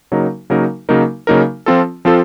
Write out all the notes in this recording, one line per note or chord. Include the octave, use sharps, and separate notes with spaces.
C#3 F#3 A#3 D#4 A#4
C#3 F#3 A#3 D#4 A#4
C#3 F#3 A#3 D#4 A#4
C#3 F#3 A#3 D#4 A#4
F3 C4 F4 A4
F3 C4 F4 A4